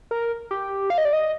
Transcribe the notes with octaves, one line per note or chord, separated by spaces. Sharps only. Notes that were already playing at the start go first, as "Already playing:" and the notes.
A#4
G4
F5
D#5
D5
D#5